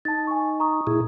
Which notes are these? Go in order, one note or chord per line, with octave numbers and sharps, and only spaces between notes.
D#4 A5 A6
G#5 C#6
A#5 C#6 D#6
A#2 E4 G#4